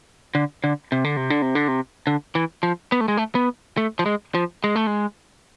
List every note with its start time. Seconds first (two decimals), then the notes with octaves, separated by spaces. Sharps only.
0.35 D3
0.64 D3
0.92 C3
1.04 D3
1.17 C3
1.30 D3
1.42 C3
1.55 D3
1.68 C3
2.07 D3
2.35 E3
2.63 F3
2.92 B3
3.01 A3
3.08 G#3
3.17 A3
3.35 B3
3.77 A3
3.99 F3
4.06 G#3
4.35 F3
4.64 G#3
4.76 A3
4.87 G#3